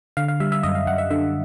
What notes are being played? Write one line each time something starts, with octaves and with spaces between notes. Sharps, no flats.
D3 F5
F5
G3 E5
E5
F#2 D#5
F5
F#2 F#5
E5
D3 E5